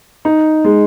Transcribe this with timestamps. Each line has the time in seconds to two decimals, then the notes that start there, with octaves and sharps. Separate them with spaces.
0.25 D#4
0.64 G#3